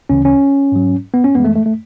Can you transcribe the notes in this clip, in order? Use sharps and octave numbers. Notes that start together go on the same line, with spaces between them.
D2 C#3 E3 C#4
C#4
G#2 F#3
B3
C#4
F#2 E3 G#3 B3
A3
A3
A3